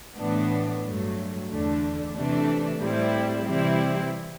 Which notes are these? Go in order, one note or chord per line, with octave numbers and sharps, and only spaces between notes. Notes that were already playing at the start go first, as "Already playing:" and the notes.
A2 E3 B3 D4
G2 F#3 A3
E2 D3 A3 D4
C3 E3 A3 D4
A2 G3 C4 E4
C3 E3 G3 C4 E4